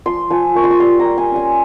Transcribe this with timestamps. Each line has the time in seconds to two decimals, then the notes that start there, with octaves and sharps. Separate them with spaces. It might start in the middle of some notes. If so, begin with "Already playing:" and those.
0.06 F3 C6
0.30 F3 G#5
0.55 A#3 C#6
0.64 C6
0.70 C#6
0.80 G3 C6
0.99 A#5
1.05 G3
1.18 G#5
1.31 C#4
1.36 G#5